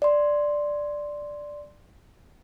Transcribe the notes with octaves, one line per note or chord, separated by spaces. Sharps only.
D5 C6